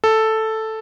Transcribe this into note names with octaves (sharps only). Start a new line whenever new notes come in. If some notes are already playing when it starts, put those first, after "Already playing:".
A4